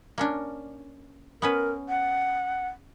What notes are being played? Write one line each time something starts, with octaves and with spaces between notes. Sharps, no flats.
A#3 C#4 D4
B3 C#4 A#4 B4
F#5